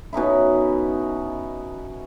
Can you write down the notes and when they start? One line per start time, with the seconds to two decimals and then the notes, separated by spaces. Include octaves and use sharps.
0.13 B2 C#4 D#4 E4